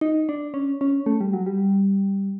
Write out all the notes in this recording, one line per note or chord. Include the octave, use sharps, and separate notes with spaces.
D#4
D4
C#4
C#4
A3
G3
F#3
G3